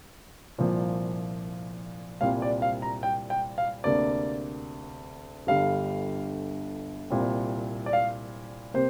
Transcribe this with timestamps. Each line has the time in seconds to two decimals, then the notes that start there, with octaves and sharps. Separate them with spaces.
0.58 C2 A#2 F3 A#3
2.21 C2 A#2 G3 C4 F5
2.42 D5
2.62 F5
2.82 A#5
3.03 G5
3.30 G5
3.58 F5
3.84 D2 C3 A#3 D5
5.47 G1 G2 D3 G3 F5
7.10 C2 A#2 G3 C4
7.86 D5
7.93 F5
8.74 C3 A#3 C5